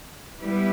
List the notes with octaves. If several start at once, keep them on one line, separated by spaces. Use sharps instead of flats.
G3 B3 E4 G4 B4